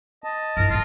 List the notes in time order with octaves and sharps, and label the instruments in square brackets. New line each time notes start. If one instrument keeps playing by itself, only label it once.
[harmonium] D#5 A5
[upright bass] G2 E4 [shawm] A#4
[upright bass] A1 D3 [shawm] F4